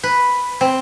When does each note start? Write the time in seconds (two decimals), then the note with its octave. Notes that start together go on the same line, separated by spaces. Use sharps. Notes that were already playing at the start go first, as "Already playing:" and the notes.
0.03 B4
0.61 C4